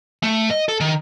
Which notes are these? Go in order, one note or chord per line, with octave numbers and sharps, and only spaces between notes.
A3
D#5
A4
D#3